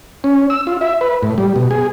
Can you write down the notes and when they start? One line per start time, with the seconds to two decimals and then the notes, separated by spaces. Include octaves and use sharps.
0.24 C#4
0.50 E6
0.67 F4
0.81 E5
1.01 B4
1.23 A2
1.38 G3
1.56 B2
1.71 G#4